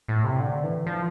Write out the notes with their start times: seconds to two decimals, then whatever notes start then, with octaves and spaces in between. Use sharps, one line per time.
0.08 A2
0.24 C3
0.40 D3
0.64 E3
0.87 F3